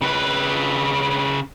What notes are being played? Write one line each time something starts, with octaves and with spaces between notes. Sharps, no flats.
C#3 B4